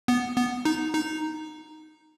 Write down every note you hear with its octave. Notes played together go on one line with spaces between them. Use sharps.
B3
B3
D#4
D#4